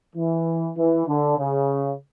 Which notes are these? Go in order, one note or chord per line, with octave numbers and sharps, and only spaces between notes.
E3
E3
D3
C#3